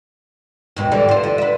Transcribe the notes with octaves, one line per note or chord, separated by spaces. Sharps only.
D#2 G#2 B2
D3 E3 G3
F4 C5
D3
B4 E5